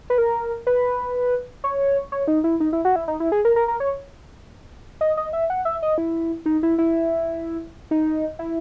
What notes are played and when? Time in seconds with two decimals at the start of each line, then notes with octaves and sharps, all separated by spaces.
0.10 B4
0.18 A#4
0.67 B4
1.64 C#5
2.12 C#5
2.28 D#4
2.44 E4
2.60 D#4
2.73 E4
2.85 F#4
2.96 E4
3.08 D#4
3.20 E4
3.32 G#4
3.45 A#4
3.56 A#4
3.68 A#4
3.80 C#5
5.01 D#5
5.17 D#5
5.33 E5
5.50 F#5
5.65 E5
5.82 D#5
5.98 E4
6.46 D#4
6.63 E4
6.78 E4
7.91 D#4
8.39 E4